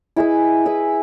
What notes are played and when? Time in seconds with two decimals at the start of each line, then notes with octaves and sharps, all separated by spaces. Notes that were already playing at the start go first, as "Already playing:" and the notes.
0.16 E4 G#4 B4 D#5
0.65 E4 G#4 B4 E5